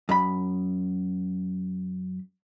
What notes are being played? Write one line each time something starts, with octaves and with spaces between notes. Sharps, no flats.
F#2 B5